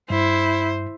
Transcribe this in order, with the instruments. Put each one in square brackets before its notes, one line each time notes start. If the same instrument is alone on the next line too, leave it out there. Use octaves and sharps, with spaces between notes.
[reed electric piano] G2 [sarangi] E4 [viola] C5